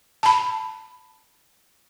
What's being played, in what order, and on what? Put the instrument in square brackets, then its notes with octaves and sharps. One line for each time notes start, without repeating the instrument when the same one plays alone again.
[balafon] A5 B5